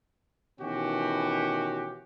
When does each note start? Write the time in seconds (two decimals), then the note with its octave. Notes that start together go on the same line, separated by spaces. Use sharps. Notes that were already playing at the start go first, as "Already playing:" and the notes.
0.60 B2 D#3 E3 C#4 F#4 G4